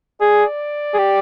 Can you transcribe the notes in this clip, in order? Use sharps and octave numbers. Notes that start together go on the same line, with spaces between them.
G#4 D5
G#4
G4